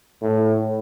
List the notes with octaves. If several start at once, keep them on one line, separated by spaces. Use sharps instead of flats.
A2